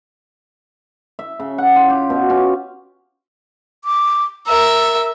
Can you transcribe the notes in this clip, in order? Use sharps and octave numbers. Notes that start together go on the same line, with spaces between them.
E5
C#3
F#5
F4
G4
B2
C#4
D6
A#4 E5 E6